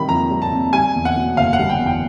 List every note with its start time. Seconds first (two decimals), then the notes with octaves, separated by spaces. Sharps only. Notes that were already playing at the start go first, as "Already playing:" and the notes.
Already playing: C3 D#3 G3 B5
0.09 F2 A#5
0.31 G3
0.42 A5
0.51 C3
0.73 G3 G#5
0.95 E2
1.05 F#5
1.16 B2
1.37 F#1 F5
1.53 F#5
1.59 G3
1.70 G5
1.80 E2
1.86 G5